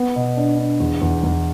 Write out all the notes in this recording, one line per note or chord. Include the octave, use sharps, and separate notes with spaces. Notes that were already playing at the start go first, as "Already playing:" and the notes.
Already playing: B3
B2
D4
D4
E2
E2
E2